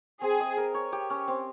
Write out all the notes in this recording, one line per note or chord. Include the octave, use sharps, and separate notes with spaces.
C4 G#4
D#5
A#4
C#5
G4
C#4
C4